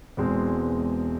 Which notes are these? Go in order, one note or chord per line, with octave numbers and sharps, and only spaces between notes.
E1 E2 B2 G#3 C4